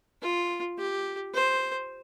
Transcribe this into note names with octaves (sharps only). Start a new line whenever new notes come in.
F4
G4
C5